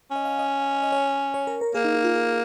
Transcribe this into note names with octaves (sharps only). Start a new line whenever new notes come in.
C#4 D#5
F5
D#5
D#5
C#5
C#5
A#4
A#4
A#3 G#4
D#4
D#4
F4
G#4